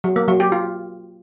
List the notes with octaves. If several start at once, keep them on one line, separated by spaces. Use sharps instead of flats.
F#3
A#3
F#3
G4
F4